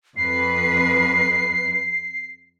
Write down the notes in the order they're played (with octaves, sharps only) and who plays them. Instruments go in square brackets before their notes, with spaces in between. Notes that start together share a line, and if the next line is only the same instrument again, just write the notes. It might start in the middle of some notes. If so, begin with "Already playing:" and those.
[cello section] F2 B4 [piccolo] C7